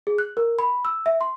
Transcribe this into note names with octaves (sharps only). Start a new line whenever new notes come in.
G#4
F#6
A#4
B5
E6
E5
C6